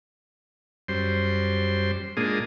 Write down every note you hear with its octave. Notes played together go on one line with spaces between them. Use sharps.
F#2 G3 C5 C6
A#2 G#3 A#3 D4 G#4 D#6